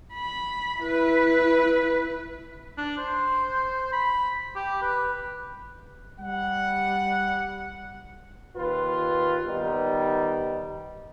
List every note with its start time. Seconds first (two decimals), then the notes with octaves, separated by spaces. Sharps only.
0.13 B5
0.79 E4 B4
2.78 D4
2.98 C5
3.93 B5
4.56 G4
4.82 B4
6.19 G3 F#5
8.56 D#2 F4 B4
9.46 D#3 G3 B3 D#4